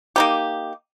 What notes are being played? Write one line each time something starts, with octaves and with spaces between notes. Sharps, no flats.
A#3 D#4 G4